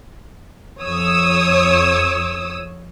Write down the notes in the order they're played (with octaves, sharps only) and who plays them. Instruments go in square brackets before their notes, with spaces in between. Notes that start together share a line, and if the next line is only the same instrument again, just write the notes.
[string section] F2 C#5 D#6 E6